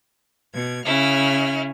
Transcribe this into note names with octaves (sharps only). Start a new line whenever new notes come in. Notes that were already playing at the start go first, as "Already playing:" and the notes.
B2 G#6
C#3 C#4 E4 F6